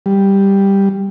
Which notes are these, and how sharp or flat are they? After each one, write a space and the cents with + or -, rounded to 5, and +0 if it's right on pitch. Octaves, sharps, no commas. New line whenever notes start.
G3 +5